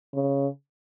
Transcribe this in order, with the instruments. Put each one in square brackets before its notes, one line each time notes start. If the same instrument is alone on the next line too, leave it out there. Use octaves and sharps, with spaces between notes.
[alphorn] C#3